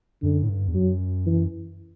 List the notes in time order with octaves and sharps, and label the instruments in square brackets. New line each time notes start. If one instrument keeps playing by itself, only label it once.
[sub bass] F#2 [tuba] D3
[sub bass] A2
G2
E2
[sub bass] F#2 [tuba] F#3
[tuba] E3